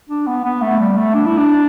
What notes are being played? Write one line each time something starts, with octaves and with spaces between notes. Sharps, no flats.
D4
B3
B3
A3
G3
A3
D4
E4
D4